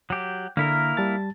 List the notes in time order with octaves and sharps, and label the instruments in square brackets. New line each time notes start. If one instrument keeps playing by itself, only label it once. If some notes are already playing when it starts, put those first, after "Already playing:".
[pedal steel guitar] F#3 G4
[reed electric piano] D3 [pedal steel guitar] A#3 E4 A#4
[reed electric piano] G3 A5 A6